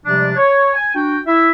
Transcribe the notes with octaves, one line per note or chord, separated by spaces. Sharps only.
C3 F3 G3 G#3 D4
C#5
G#5
D4 F#4 G5
E4 E5